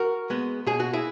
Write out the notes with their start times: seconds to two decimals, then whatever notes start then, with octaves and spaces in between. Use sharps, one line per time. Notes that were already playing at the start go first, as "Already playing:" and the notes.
Already playing: F#4 A#4
0.30 G#3 B3
0.66 B2 G#4
0.80 F#4
0.93 E4 G#4